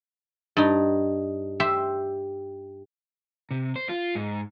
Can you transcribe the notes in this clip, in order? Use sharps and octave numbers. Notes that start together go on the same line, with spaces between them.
G2 D#4
G4 C5 E5
C3
C5
F4
G#2